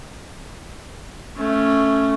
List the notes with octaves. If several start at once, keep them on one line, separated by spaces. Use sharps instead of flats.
A3 C#4